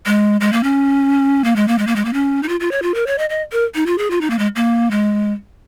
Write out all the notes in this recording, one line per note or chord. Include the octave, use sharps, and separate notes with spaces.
G#3
G#3
A#3
C#4
A#3
G#3
A#3
G#3
A#3
G#3
A#3
C#4
D#4
F4
F4
C#5
F4
A#4
C#5
D#5
D#5
A#4
D#4
F4
G#4
F4
D#4
A#3
G#3
A#3
G#3